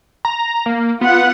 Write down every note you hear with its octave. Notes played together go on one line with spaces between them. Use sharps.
A#5
A#3
B3 F4 F#5